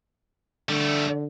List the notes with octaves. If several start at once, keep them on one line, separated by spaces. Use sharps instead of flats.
D3 G3 A3